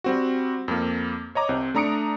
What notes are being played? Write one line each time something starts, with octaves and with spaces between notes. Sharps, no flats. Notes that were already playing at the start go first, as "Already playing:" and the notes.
G3 C4 F#4
F2 A#3
C#5 D#5 A#5 D6
C2 C4
A3 D4 A#5 D#6 C#7 D7